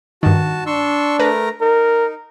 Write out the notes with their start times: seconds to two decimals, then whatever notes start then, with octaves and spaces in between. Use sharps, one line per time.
0.23 G2 D#3 F#4 A5
0.67 D4 C6 C#6 E6
1.19 A3 A#4 B4 A#5
1.61 D#4 A#4